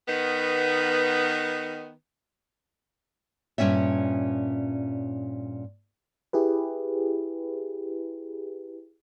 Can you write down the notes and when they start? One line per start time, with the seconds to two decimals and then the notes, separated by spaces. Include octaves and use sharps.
0.07 D#3 B3
3.58 G2 A#2 C#4 C#5 E5
6.33 E4 G4 G#4 B4